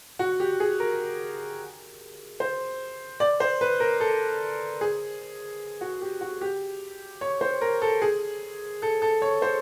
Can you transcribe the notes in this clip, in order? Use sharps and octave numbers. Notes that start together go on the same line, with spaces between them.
F#4
G4
G#4
A#4
C5
D5
C5
B4
A#4
A4
G#4
F#4
G4
F#4
G4
C#5
C5
A#4
A4
G#4
A4
A4
C#5
C5